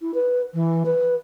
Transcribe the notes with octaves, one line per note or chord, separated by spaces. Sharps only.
E4
B4
E3
B4